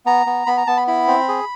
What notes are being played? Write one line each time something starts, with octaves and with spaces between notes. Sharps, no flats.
B3 A#5
B3
B3 B5
A#5
B3 A5
B5
E4 B5
C4
G#4